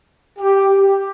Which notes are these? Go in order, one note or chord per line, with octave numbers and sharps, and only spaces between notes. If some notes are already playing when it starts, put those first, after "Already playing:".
G4
G4